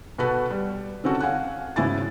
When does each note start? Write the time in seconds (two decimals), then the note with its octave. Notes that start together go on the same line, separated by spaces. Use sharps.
0.18 B2 F#4 A4 B4
0.51 G3
1.04 D3 C4 C#4 F#4 A4
1.20 F5 F#5 G#5 F#6
1.76 G#1 C#3 E4 G#5 A6